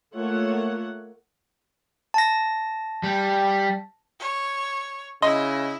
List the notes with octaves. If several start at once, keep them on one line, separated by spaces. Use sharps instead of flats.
A3 A#3 F4 C#5 F#5
A5 A#6
G3
C#5
C#3 E4 D#5 C6